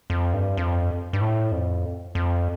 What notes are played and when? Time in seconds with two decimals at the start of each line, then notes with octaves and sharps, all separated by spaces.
0.10 F2
0.33 G2
0.57 F2
1.13 G2
1.21 A2
1.52 F2
2.15 F2